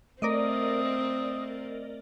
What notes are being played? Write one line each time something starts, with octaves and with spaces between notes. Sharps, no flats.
A3 C4 A#4 D5 D#5 D#6